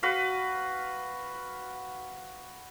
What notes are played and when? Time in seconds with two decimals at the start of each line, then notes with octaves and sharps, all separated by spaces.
0.03 F#4 B4 F5